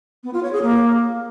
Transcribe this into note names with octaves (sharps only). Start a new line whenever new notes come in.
B3
F4
C#5
G#4
A#3